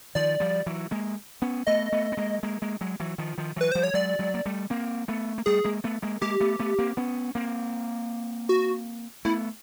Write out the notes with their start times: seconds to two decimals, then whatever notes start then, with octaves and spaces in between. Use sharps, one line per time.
0.15 D#3 F3 D5
0.40 F3 G3
0.66 E3 F#3
0.91 G#3 A#3
1.42 B3 C#4
1.67 A3 B3 D#5
1.92 A3 B3
2.12 B3
2.17 G#3 A#3
2.43 G#3 A#3
2.62 G#3 A#3
2.81 F#3 G#3
3.00 E3 F#3
3.18 D#3 F3
3.38 D#3 F3
3.56 E3 F#3 B4
3.72 F3 G3 C5
3.83 C#5
3.94 F#3 G#3 D5
4.19 F#3 G#3
4.34 A#3
4.46 G3 A3
4.70 A#3 C4
5.08 A3 B3
5.38 A#3
5.46 G3 A3 G#4
5.64 G#3 A#3
5.84 A3 B3
6.02 G#3 A#3
6.21 G#3 A#3 G4
6.40 A3 B3
6.59 A3 B3
6.79 A#3 C4
6.97 B3 C#4
7.35 A#3 C4
8.49 F#4
9.25 A3 B3 E4